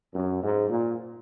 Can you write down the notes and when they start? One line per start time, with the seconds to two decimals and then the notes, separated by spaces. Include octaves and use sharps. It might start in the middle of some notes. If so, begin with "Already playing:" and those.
0.14 F#2
0.42 G#2
0.70 A#2